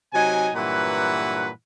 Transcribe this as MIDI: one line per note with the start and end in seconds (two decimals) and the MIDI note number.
0.12 0.49 48
0.12 0.49 54
0.12 0.49 63
0.12 0.49 80
0.55 1.49 43
0.55 1.49 46
0.55 1.49 52
0.55 1.49 54
0.55 1.49 71
0.55 1.49 78